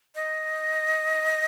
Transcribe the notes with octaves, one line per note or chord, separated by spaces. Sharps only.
D#5